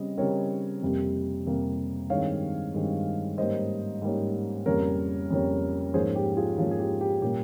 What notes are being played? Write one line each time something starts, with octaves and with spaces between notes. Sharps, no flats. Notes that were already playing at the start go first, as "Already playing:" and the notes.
Already playing: C#3 G3 C4 D#5
C#3 G3 C4 A#4 C#5
F2 C3 G3 A#3
F2 C3 G3 A#3
G2 D#3 G#3 C4 C#5 F5
G2 D#3 G#3 C4
G#2 G3 A#3 C#4 C5 D#5
G#2 G3 A#3 C#4
F2 C#3 G3 A#3 C#4 A#4 C#5
F2 C#3 G3 A#3 C#4
G#2 F3 A#3 C#4 G#4 C5
G4
F4 G#4
G#2 F3 A#3 C#4 F4
G#4
G4
G4
A#2 G3 A#3 C#4 G4